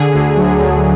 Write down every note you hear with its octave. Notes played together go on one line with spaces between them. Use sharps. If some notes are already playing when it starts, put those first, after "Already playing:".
Already playing: D3 G#4
D2
F#3
D2